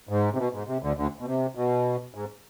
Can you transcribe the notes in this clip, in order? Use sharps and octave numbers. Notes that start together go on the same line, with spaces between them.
G#2
C3
B2
G#2
C3
D2 D3
D2 D3
B2
C3
B2
G#2